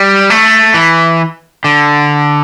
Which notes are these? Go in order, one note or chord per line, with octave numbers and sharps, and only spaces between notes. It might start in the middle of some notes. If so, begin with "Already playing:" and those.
Already playing: G3
A3
E3
D3